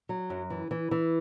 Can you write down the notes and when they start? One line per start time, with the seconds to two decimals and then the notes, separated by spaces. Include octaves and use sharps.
0.09 F#3
0.30 F#2
0.50 E3
0.71 E3
0.91 E3